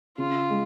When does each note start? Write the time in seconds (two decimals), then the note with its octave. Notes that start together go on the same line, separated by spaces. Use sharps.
0.18 C#3 F4
0.50 G#3